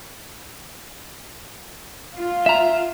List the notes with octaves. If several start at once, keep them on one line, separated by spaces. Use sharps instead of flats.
F4
E5 A#5